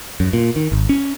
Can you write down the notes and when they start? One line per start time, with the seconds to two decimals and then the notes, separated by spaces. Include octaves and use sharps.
0.20 F#2
0.33 A#2
0.56 D#3
0.72 G#1
0.89 C#4